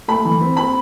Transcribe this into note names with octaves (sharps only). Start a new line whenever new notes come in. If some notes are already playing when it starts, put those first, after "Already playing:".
A3 B5
E3
C4
C4 B5